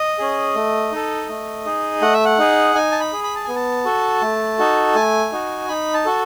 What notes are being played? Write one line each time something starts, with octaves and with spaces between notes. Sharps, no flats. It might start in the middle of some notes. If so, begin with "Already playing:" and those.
Already playing: D#5
C#4 G#4
A3
D#4 A4
A3
D#4 G#4
A3 F#5
E5
F#5
D#4 G#4
D#4 G#5
A5
B5
G#4
B5
A5
B3 G#5
A5
F#4 A4
A3
D#4 F#4 A4
A3 G#5
D#4 F#4
D#4 B5
A5
F#4 A4